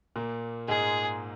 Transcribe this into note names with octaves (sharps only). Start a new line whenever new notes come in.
A#2 A#3
G#2 G#3 G#4